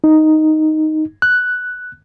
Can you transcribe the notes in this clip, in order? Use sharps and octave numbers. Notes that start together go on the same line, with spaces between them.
D#4
F#6